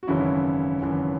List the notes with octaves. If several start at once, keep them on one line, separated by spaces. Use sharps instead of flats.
F#4
G#1 F#2 C#3 E3 C#4 E4
G#1 F#2 C#3 E3